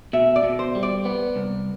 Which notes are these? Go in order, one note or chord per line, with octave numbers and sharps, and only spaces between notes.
B2 E5
D5
B2
C5
G3
D5
B3
C2